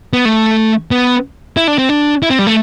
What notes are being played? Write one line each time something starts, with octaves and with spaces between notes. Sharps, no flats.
B3
A3
B3
E4
D4
C4
D4
E4
C4
G3
A3